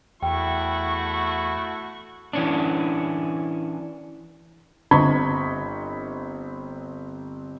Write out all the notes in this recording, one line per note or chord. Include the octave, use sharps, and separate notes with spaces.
E2 A3 E4 F#4 G5 C#6
E3 C#4 D4
G1 C4 D#5 B5 C#6 G#6